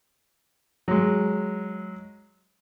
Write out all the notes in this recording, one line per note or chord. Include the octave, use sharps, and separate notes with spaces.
F#3 G#3